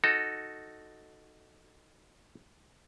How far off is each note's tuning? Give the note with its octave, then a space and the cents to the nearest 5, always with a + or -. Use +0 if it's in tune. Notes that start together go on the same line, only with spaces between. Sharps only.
D#4 +0 F#4 +0 A4 +0